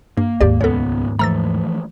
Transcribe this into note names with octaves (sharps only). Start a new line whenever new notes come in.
G2 A#3
D#2 G#2 G4 D5
C#2 F#3 B3 A4 C#5
E3 F3 A3 A#5 E6 A6